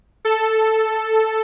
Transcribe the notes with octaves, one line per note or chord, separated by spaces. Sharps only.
A4